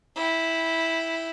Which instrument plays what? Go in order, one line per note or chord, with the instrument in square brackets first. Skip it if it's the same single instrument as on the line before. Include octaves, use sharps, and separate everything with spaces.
[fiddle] E4 G5